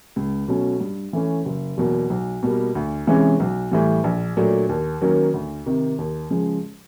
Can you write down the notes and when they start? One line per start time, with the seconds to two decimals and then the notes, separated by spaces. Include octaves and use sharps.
0.16 C#2
0.48 B2 F#3 A3 C#4
0.80 G2
1.13 E3 A3 C#4
1.46 F#1
1.77 E2 B2 F#3 A#3
2.10 B1
2.43 B2 G3 A#3
2.75 D2
3.07 C3 E3 G#3 C#4
3.40 B1
3.71 A2 E3 G3
4.04 A#1
4.37 A#2 F#3 A3 D4
4.69 D#2
5.01 D#3 F#3 A#3 C#4
5.34 D2
5.66 C3 D#3
5.99 D#2
6.30 C#3 F3 G#3